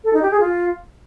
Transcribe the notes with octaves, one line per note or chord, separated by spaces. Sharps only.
A4
D#4
G4
G#4
F4